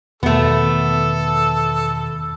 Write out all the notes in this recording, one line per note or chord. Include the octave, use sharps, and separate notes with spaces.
E2 B2 D#3 A3 B3 A4